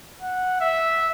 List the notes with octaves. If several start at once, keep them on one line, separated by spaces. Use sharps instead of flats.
F#5
E5